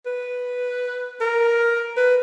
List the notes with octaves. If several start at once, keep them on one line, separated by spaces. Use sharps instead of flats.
B4
A#4
B4